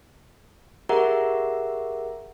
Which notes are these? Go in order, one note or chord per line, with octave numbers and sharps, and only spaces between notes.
G4 G#4 A#4 E5 F#5 A#5